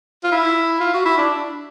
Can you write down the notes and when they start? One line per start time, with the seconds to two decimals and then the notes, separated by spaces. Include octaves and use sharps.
0.24 F4
0.32 E4
0.80 F4
0.94 F#4
1.05 E4
1.18 D4